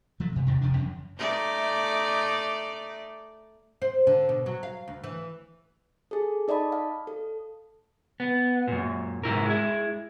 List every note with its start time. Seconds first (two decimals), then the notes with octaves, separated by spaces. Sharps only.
0.20 F3 F#3 A3
0.33 G2 C3
0.47 E2 G2 C3
0.61 E1 C3 F3 D4
0.77 F#2 C#3 F3
1.19 A3 D#4 D5
3.82 C5
4.07 D3
4.29 B2
4.46 F#3
4.63 F5
4.88 D2
5.04 E3
6.11 G#4 A4
6.48 D#4 D5 D#5 A5 B5
6.72 F5
7.07 A4
8.20 B3
8.68 F#2 A#2
9.24 G#2 C3 E4 A#4
9.45 G#3 E4